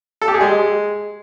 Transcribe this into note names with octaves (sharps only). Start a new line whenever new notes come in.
A4
G4
G#4
G#3